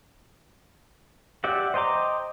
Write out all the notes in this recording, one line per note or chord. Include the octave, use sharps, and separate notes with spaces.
G4 D5 E5 F#5
C5 D#5 G5 A#5 D6